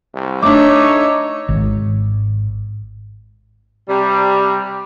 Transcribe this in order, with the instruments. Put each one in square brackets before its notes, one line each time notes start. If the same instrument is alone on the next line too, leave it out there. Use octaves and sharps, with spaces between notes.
[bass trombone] C2
[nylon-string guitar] A3 D4 [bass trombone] D#4 [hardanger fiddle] C#5 E5 [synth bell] D6
[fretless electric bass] G#1
[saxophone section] C3 G3